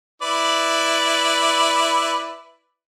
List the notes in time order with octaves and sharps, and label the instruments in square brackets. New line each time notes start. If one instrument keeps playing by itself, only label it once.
[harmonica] E4 B4 D5